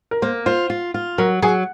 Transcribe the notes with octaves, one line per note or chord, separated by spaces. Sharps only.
A#4
A#3 C5
F4 C5
F4
F4
F#3 A#4
F#3 G#4